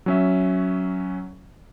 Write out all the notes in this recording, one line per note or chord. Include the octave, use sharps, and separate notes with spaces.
F#3 C#4 E5